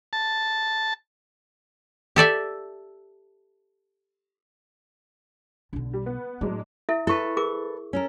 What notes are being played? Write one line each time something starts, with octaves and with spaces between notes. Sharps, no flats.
A5
G4 A4 D5 E5
B1 B2 D3
G3
B3
A2 F#3 G#3 D4
E4 A4 E5
E4 A4 B4 C#6
G#4 A#4 D6
C#4 A4 A#4